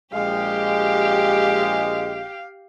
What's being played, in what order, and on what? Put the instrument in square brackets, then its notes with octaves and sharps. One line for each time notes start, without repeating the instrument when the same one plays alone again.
[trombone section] A#1 G#3 [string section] G4 [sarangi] F5